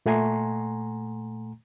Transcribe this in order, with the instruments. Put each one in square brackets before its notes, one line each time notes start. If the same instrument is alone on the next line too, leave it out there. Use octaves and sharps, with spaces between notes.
[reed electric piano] A#2 A3 F#5 G#5 A#5 C6